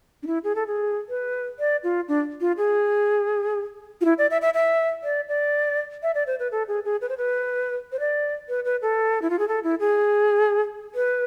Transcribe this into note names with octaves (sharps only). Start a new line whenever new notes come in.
D4
E4
G#4
A4
G#4
B4
D5
F4
D4
F4
G#4
F4
E4
D5
E5
E5
E5
D5
D5
E5
D5
C5
B4
A4
G#4
G#4
B4
C5
B4
C5
D5
B4
B4
A4
E4
F4
G#4
A4
E4
G#4
B4